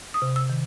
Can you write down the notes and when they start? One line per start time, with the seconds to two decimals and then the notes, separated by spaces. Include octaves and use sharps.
0.14 D#6
0.22 C3
0.36 E6
0.50 D#3